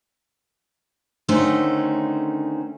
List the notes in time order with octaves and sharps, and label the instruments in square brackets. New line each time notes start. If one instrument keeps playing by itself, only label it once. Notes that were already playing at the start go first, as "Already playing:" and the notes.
[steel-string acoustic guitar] D3 D#3 A3 C#4 D#4 C5